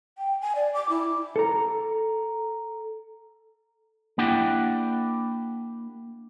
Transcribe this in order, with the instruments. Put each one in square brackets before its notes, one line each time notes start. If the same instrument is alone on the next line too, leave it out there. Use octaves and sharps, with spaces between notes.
[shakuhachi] G5
G#5
D5
D6
E4
[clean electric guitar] A4 A#5
A#3 D4 E4 G4 F#5 G5